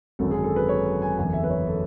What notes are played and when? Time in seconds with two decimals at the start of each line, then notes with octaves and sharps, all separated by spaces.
0.19 G#1 F#2 D3 A4
0.31 G#4
0.44 A4
0.56 B4
0.69 C#5
1.02 G#5
1.17 F#1 E2 D3 G#5
1.33 E5
1.44 B4
1.50 C#5
1.67 A4